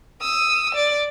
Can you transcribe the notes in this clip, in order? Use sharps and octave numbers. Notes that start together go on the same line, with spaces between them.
D#6 E6
D5